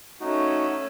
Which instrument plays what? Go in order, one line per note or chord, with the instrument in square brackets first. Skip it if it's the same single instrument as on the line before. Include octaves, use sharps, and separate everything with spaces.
[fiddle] A3 C#4 [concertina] D#4 F#4